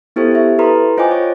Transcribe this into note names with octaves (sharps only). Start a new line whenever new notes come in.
B3 E4 G4 A4 C5
G4 E5
E4 A4 B4 A#5 C6
F4 C5 D#5 G5 G#5 D6
C#5